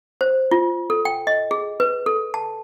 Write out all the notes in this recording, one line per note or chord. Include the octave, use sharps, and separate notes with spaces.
C5
F4
A4
G5
D#5
G#4
B4
A4
A5